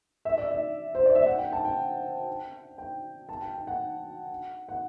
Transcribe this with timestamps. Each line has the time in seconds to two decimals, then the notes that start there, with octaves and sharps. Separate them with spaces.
0.25 E5
0.38 D5
0.51 E5
0.95 C5
1.06 D5
1.15 E5
1.26 F#5
1.38 G5
1.52 A5
1.65 G5
2.78 G5
3.29 A5
3.42 G5
3.54 G5
3.67 F#5
4.69 F#5